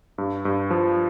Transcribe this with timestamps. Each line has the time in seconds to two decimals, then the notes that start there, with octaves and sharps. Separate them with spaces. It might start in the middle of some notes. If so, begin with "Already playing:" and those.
0.18 G2
0.45 G2
0.71 F3